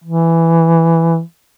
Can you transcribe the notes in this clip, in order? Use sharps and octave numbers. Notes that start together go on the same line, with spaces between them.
E3